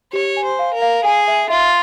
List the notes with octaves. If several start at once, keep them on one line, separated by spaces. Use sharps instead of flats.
G4 C#5
G#5
C5
F5
A#4
F5
G#4 G#5
E5
F4 E5